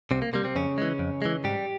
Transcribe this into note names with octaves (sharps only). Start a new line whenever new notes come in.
C2 C3 C4
A#3
C3 G3 A#3
C3 C4
F2 C#3 C#4
E3 G#3
F2
E3 G#3
G#2 G3 G4